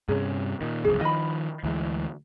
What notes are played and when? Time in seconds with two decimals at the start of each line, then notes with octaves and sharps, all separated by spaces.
0.09 G2 C3 C#4 G#4
0.61 A#2 D#3
0.84 F#1 C2 F2 G#4
1.01 D#3 F3 D#5 B5
1.64 D2 E3 G#3